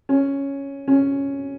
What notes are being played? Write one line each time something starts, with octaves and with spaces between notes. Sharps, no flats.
C#4
C#4